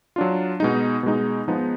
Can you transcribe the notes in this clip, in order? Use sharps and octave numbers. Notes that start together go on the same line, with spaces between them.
F#3 D4 F4
B2 G#3 D#4
B2 G#3 D#4
F3 G#3 B3 D#4